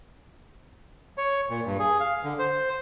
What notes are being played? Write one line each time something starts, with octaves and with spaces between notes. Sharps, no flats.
C#5
A#2
G2
G#4
F5
D3
C5